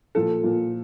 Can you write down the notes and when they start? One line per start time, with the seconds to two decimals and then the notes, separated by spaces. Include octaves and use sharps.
0.15 A#2 F3 A4
0.43 A#2 F3